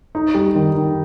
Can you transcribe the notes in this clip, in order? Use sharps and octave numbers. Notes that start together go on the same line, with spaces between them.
D#4
G3
D#3
D#3